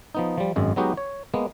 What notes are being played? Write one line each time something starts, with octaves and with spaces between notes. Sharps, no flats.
F3 B3 D#4
F3 G3
G#1 F#2 G#3
F#3 G#3 B3 D#4 F#4 G4
C#5
G#3 A#3 B3